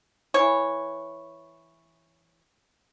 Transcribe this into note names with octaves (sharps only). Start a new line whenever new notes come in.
E3 C#5